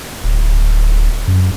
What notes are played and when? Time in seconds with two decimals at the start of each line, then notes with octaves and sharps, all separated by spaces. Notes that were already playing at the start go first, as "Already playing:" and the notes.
0.24 D1
1.27 F#2